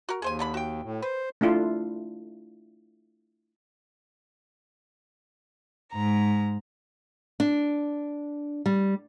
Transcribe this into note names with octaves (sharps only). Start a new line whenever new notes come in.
F#4 A#4
D#2 G#4 C5 G#5
D3 G#3 B5
F#4 G5
A2
B4 C5
A3 D4 E4 F4
G#2 A#5
D4
G3